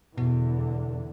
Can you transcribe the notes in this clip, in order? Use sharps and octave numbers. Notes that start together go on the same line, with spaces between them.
E2 B2 D3